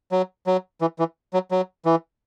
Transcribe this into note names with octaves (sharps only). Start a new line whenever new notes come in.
F#3
F#3
E3
E3
F#3
F#3
E3